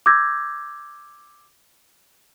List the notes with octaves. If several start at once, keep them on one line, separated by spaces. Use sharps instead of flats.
D6 E6 G6 G#6 A#6